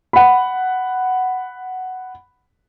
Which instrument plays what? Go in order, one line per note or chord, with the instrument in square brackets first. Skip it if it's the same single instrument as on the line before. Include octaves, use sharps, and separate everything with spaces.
[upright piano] F#5 B5